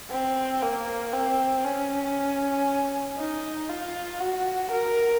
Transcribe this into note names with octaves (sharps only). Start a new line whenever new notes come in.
C4
A#3
C4
C#4
D#4
F4
F#4
A#4